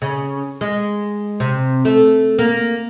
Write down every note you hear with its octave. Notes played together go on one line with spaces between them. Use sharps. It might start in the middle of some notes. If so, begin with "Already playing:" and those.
C#3
G#3
C3
A3
A#3